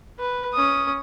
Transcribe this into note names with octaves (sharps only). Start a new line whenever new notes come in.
B4
C#4 D#6